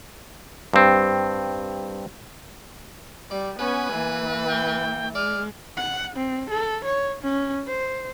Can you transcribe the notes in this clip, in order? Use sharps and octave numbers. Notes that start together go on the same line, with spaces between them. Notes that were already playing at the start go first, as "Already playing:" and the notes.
G2 C4
G3 D5
B3 C#4 B4 G#5
E3 A#3
G5
G#3 D5 F6
F#5
C4
A4
C#5
C#4
C5